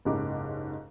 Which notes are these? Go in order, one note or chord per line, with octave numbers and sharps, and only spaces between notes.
F#1 C#2 G#2 C#3 G4 D6